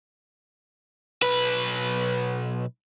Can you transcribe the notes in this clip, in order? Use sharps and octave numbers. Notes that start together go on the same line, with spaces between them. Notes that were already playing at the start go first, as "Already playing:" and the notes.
B1 B4